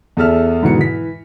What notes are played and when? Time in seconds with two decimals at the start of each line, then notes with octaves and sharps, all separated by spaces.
0.17 E2 G#4 A4 E5 E6 F6
0.62 G#2 B2 E3 C#7
0.79 E3 B6